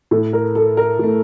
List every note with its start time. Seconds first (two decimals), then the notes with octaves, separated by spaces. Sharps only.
0.11 A2 A3 A4
0.33 A#4
0.55 A4
0.77 A#4
0.99 A2 A3